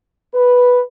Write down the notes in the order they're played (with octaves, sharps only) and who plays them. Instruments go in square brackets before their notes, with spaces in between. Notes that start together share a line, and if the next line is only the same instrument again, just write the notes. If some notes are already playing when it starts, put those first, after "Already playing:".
[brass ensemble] B4